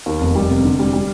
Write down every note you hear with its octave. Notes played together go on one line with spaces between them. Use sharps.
D#2
F1
G3
C3
D3
G3
G3